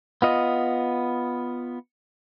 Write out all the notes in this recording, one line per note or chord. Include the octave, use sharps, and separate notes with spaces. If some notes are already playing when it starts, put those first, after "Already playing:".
B3 F4 D#5